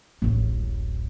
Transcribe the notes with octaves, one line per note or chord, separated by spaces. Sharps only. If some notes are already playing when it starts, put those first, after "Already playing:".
D1 A1